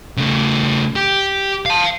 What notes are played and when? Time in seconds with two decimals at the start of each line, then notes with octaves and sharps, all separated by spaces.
0.17 C#3 A3
0.96 G4
1.66 F5 A5